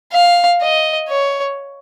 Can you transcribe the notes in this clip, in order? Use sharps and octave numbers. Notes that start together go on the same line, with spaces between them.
F5
D#5
C#5